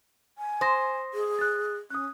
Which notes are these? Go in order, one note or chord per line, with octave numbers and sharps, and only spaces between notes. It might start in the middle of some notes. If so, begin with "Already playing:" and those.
G#5
C5 D#6 A#6
G#4
F#6 A6
C#4 D#6 F#6